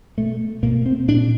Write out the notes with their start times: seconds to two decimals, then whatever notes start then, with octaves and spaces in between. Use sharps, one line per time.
0.17 B2 A3
0.63 B2 A#3
0.86 C4
1.08 A#2 D4